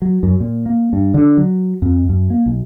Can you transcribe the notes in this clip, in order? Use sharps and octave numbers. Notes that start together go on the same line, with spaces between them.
F#3
F#2
A#2
A#3
G2
D3
F#3
F2
F#2
A#3
B1